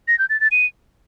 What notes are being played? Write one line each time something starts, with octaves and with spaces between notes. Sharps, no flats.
A#6
G6
A6
A6
D#7